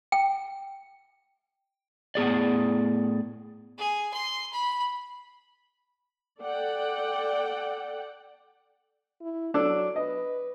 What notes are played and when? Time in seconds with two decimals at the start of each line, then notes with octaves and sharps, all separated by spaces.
0.12 G5
2.15 A2 B3 G#4 D5
3.78 G#4
4.13 C6
4.52 B5
6.40 A4 D5 F#5 G5
9.22 E4
9.54 F#3 D4 A4
9.96 B4 D#5